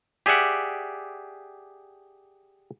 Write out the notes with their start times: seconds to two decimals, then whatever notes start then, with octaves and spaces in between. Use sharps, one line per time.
0.26 G4 G#4 D5 E5 F#5